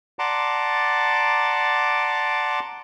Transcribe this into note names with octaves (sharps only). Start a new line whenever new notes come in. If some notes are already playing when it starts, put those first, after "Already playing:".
D5 F#5 A5 A#5 C6 D6